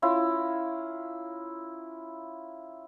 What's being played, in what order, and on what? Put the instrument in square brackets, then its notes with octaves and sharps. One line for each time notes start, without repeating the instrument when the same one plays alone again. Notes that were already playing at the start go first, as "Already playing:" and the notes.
[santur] C#4 E4 F4 A#4